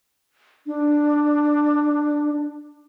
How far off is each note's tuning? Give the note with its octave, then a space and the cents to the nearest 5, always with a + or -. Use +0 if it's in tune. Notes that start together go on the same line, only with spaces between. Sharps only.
D4 +10